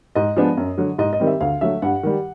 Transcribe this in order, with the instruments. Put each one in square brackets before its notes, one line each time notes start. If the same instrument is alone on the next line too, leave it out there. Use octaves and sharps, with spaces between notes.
[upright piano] G#2 D#5
F3 G#3 B3 D4
F#2
D3 F#3
G#2 D#5
D#5
D#3 G3 C4
E5
D2 F5
D3 F#3 A3 E5
G2 F#5
D#3 G3